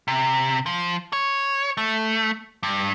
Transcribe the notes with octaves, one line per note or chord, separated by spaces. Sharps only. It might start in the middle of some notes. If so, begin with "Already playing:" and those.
C3
F3
C#5
A3
G2